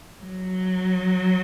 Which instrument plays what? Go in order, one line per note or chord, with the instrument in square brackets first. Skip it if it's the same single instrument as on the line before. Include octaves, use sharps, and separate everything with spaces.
[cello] F#3